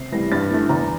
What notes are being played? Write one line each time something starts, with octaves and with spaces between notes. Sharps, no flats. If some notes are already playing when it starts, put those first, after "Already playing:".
Already playing: C3 C7
E3 G3 A#6
G2 A6
E3 A3
E2 A#5